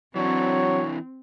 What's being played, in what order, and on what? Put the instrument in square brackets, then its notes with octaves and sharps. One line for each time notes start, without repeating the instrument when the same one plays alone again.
[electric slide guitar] E3 D4 [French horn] F#3 [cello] C4 [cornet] C#5